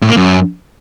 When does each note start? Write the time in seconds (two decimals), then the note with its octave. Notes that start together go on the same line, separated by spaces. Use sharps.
0.02 A2
0.09 A#3
0.17 F#2